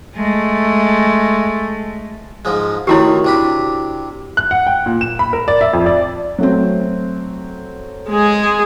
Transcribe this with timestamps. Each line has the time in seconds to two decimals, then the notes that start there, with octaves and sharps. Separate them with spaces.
0.16 G#3 A3
2.45 G#2 F3 G#3
2.87 D#3 A3 E4 F#4 G4 C#5
3.25 C3 D4 B5
4.37 F#6
4.51 F#5
4.67 G5
4.86 A#2
5.01 E7
5.19 B5
5.33 A#4
5.48 D5
5.61 E5
5.73 F2
5.86 D5
6.38 F#3 A3 C4
8.09 G#3 G#4